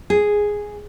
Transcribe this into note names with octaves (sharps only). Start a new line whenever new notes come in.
G#4